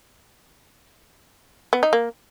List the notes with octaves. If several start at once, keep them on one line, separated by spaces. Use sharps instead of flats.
B3
D#4
A#3